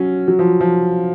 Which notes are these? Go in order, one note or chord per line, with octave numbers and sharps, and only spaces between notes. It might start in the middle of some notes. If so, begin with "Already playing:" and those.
Already playing: F#3 C#4
F#3
F3
F3